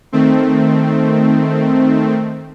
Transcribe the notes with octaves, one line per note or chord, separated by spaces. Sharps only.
D#3 A3 C4